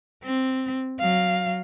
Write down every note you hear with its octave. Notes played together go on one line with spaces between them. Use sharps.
C4
F#3 F5